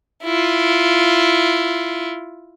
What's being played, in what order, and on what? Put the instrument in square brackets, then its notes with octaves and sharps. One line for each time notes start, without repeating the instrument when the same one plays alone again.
[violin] E4 F4